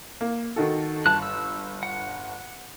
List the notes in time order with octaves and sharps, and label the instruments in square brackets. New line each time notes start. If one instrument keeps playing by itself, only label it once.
[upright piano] A#3
D#3 F#4 A4
[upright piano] G1 [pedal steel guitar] A5 F#6
[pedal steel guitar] E6
F#5